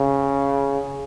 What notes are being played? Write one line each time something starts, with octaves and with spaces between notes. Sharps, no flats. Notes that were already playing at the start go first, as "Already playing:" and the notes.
Already playing: C#3